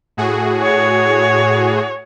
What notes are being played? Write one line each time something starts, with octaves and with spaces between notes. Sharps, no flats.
A2 F#4 G#4
C#5